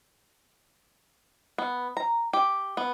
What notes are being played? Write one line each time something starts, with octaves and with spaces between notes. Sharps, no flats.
B3
A#5
G4
B3